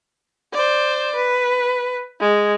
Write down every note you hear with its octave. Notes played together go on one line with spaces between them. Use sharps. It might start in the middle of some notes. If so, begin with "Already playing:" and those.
C5 D5
B4
G#3